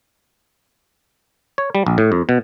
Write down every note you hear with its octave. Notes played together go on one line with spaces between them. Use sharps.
C#5
G3
A#1
A2
F2
B2